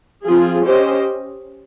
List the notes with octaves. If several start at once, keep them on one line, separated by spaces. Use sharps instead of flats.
F3 C4 F4 G#4
C#4 G4 C5 D#5